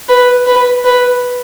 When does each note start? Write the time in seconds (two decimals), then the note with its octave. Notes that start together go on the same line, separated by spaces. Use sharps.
0.08 B4
0.46 B4
0.85 B4